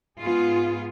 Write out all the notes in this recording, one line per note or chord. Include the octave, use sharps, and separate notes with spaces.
G#2 B3 F4 G#4